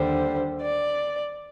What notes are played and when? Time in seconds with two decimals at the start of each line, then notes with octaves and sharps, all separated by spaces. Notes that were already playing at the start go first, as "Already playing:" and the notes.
Already playing: D#2 D3 G3 C5
0.61 D5